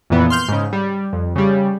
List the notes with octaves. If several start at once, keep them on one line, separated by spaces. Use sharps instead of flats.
F2 A#2 E3 B3
C6 F6 G6
G#2 C#3
G3
F2
C#3 G3